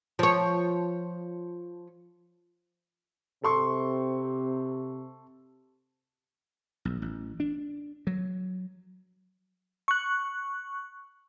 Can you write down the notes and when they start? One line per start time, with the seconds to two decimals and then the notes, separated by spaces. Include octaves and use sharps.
0.19 F3 C#5
3.43 C3 A4 C6 C#6
6.85 B1
7.02 A1
7.40 D4
8.07 F#3
9.88 C#6 F#6